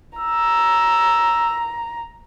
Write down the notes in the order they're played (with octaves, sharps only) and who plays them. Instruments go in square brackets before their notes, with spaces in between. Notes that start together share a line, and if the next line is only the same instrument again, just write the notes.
[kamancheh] A#5 [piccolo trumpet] E6